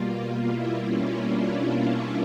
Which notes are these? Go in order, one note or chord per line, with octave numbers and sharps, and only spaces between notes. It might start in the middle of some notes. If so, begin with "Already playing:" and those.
Already playing: B2 G3 A#3 F4
E4
C#4
D4
E4